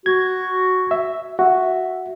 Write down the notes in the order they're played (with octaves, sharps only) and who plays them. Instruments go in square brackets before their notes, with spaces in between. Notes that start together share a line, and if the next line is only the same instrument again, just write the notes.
[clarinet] F#4 [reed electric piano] G#6
[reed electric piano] E5
[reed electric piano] F#4 [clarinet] E5